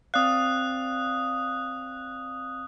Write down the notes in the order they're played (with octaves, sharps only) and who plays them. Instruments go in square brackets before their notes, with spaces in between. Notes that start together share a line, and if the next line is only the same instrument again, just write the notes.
[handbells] C4 D5 F5 [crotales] D#6 F#6